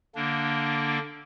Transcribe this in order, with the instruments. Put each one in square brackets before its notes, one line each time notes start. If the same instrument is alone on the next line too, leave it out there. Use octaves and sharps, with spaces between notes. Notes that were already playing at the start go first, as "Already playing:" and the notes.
[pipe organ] D3 A#3 D4